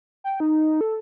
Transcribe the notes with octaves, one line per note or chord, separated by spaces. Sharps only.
G5
D#4
A4